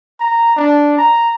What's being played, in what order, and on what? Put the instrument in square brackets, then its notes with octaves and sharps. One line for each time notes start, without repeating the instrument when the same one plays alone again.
[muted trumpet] A#5
D4
A#5